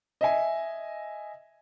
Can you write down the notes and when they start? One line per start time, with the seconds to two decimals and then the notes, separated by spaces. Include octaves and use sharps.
0.21 D#5 E5 G#5